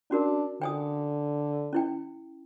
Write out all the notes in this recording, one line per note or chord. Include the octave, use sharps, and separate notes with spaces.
C#4 D4 F#4 A#4
D3 G5 G#5 D#6
C#4 E4 G5